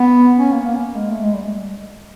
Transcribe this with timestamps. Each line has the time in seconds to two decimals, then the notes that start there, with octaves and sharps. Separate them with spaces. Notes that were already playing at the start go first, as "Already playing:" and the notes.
Already playing: B3
0.38 C#4
0.52 A#3
0.66 A#3
0.95 G#3
1.10 A3
1.23 G#3
1.34 G3